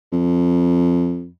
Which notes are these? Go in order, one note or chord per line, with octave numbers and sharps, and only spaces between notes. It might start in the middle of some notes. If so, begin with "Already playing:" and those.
F2